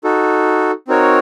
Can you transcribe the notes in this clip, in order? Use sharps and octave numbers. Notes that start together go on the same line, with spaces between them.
D#4 F#4 A4
C4 D#4 F#4 A#4 C#5